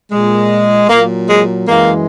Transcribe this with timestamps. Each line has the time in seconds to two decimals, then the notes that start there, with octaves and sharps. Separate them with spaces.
0.11 A#2 G#3
0.89 A#2 F#3 A#3
1.28 G#3
1.67 F#2 E3 G#3 A#3